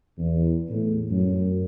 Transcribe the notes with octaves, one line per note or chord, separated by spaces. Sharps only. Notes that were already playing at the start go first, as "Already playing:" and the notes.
E2
A2
F#2